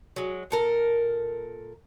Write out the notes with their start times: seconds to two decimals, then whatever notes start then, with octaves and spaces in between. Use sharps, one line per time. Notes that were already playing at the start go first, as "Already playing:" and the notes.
0.16 F#3 G#3
0.51 A#2 A4 A#4